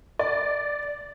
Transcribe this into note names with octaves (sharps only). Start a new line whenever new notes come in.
D5